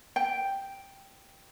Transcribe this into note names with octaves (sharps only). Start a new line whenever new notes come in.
G5